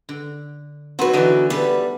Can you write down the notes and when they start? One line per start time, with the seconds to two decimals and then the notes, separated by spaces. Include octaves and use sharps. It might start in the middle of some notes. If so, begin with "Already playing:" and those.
0.09 D3
0.99 F#3 B3 C4 D#4 F#4 B4
1.13 D3 E3 D4 D#4 D#5
1.50 G3 A3 B3 A4 B4